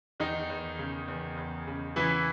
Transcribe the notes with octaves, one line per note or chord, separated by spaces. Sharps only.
E2 D#3 D#4
E2
C#3
E2
E2
C#3
C#3 E3 E4